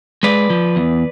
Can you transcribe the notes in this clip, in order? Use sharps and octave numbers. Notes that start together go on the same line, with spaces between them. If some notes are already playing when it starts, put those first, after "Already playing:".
G#3 B4 D5
F3
E2